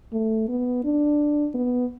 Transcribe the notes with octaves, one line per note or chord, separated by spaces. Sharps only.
A3
B3
D4
B3